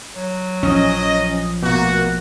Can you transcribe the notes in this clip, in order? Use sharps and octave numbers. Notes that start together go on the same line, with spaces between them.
F#3
A#1 F3 C#4 D#5
D2 B2 A#3 F#4